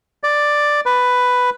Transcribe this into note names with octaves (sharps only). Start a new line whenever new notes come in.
D5
B4